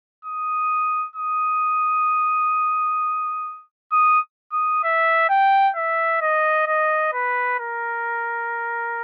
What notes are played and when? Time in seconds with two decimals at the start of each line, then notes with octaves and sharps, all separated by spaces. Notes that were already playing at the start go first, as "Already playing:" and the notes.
0.25 D#6
1.16 D#6
3.92 D#6
4.53 D#6
4.84 E5
5.29 G5
5.76 E5
6.22 D#5
6.67 D#5
7.13 B4
7.60 A#4